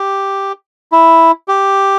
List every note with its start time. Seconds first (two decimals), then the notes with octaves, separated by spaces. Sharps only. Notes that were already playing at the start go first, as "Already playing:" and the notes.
Already playing: G4
0.92 E4
1.48 G4